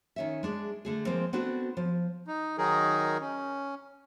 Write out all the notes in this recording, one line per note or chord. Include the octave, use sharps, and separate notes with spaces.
D#3 C#4 E5
G#3 D4 G#4
D3 A3 G#4
F3 G#3 A#3 C4
B3 C4 D4 F#4 A4
F3
D#4
D#3 F#3 D#4 G#4 A#4
C#4